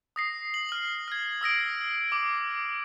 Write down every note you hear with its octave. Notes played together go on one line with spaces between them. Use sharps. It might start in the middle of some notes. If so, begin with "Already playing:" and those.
D#6 A#6 C7
F#7
F6 F#7
F6 G#6
D#6 E6 A#6 D7
D6